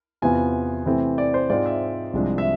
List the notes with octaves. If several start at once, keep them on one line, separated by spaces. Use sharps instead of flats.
E2 C3 E3 B3 F4 G#5
C3 E3 A3 C4 E4
D5
C5
G#2 G#3 C4 F4 D5
E5
C2 C3 F3 G#3 D4
E5